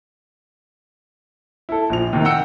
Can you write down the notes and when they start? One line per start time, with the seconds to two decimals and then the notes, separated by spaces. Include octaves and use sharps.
1.69 E4 A4
1.90 A#1 F3 F7
2.13 D#2 C3 D#3
2.25 F#5 G5 E6 C#7